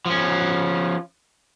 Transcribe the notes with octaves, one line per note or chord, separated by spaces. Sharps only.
F3 C#4